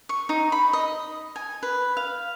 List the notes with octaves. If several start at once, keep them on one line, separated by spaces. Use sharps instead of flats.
C#6
D#4
B5
D#5
G#5
B4
F5